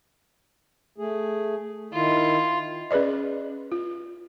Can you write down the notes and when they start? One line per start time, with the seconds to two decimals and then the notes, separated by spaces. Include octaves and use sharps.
0.98 A3 G#4
1.93 D#3 E4 F4
2.91 C#4 G#4 B4 D5 D#5
3.72 F4